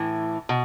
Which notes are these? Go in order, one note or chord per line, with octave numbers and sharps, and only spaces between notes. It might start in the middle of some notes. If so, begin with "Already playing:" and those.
Already playing: A2 E3
B2